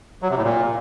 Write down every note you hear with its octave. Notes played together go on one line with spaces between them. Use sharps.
F#3
C3
A2
A#2